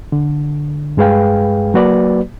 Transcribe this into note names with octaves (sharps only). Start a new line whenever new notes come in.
D3
G2 G#3 G#4 B4 F5 G5
F#3 A#3 F#4 B4 D5